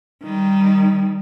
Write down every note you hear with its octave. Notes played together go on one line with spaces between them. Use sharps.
D#3 G3